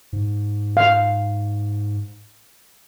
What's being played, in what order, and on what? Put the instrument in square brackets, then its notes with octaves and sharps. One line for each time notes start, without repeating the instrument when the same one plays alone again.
[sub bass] G#2
[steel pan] F5